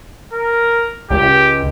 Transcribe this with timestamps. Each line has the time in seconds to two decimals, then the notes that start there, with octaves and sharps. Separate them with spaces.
0.33 A#4
1.10 C#2 G4